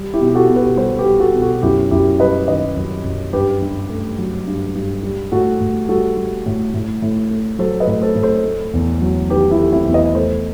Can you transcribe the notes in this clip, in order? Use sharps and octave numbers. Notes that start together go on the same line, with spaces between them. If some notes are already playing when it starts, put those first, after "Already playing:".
Already playing: G3
E4 G4
B2
G4
F#4 A4
B2
G4 B4
G3 A4 C5
G4 B4
G3
F#4 A4
B2
F#4 A4
F#2 E4 G4
F#2 E4 G4
G3 B4 D#5
D#3 B4 D#5
F#2
F#2
G2 G4 B4
G2
A3
F#3
G2
G2
G3
A2 F#4 A4
A2
G3 F#4 A4
G3
A2
A2
A2
A3
F#3 A4 C5
B4 D#5
A2
A4 C5
A2
A4 C5
A3
E2
F#3
D#3 G4 B4
E4 G4
A3
C4 E4
E2
B4 D#5
A3 A4 C5